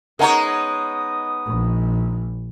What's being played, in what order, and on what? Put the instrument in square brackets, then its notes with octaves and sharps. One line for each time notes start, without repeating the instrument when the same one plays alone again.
[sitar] G#3 D#4 C#5 [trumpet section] B3 D#6 [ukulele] A#4 F#5 A#5
[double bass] A#1